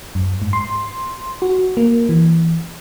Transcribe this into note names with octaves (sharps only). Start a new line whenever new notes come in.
F#2
G#2
C6
F#4
A#3
E3